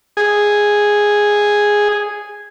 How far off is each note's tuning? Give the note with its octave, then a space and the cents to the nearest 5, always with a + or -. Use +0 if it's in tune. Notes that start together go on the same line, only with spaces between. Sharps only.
G#4 -5